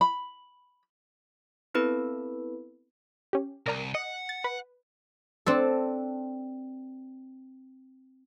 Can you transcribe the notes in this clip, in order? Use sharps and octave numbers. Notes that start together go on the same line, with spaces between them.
B5
B3 C4 E4 A4 B4 B5
C#4 G4
C2 A#4 D5 A#5
D#5 F#5
A6
B4
C4 D4 A4